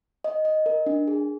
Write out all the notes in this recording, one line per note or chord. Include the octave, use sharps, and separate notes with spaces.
D#5
D#5
A#4
D4
G#4